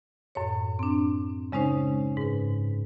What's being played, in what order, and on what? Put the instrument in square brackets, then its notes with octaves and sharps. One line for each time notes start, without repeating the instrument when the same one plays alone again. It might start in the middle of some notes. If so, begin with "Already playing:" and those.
[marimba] F#2 A2 C#5
C4 D4
C#3 G#3 C#4 D#4 C5
G#2 B4